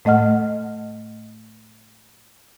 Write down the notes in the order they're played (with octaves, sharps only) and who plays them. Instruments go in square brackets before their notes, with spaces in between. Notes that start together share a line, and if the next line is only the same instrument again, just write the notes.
[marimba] A2 A3 D#5 F#5 F6